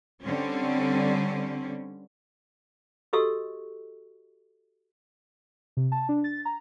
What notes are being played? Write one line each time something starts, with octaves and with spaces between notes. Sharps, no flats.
D3 G3 C4 C#4
F#4 G4 A4 D#5 C#6 E6
C3
A5
D4
A6
A#5